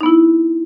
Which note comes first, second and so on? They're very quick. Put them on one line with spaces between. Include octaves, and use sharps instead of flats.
D#4 B3 E4